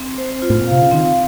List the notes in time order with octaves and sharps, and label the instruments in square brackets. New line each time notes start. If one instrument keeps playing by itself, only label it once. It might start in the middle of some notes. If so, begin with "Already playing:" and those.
Already playing: [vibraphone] C4
C5
F4
[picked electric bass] A2
A#2
[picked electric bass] C3 [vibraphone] F5
[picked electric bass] C#3
[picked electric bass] D#3 [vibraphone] C4